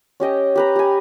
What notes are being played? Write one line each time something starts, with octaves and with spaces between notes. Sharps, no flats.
C#4 G4 D#5 G5
G4 B4 A#5
G4 G#5